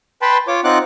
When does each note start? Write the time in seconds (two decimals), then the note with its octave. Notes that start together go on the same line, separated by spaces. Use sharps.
0.22 B4 G5 A5 B5 C6
0.48 F4 C#5 D6
0.64 C4 D#4 F4 F#5 D6 F#6